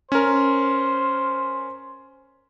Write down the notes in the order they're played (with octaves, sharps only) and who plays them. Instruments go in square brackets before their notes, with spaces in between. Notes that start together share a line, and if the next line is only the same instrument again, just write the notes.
[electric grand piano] C#4 A#4 [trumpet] C5